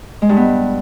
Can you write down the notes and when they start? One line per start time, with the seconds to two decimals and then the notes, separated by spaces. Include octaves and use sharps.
0.22 G#3
0.29 G2
0.37 B3